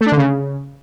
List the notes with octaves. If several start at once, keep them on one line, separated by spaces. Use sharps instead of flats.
A3
D4
D3
C#3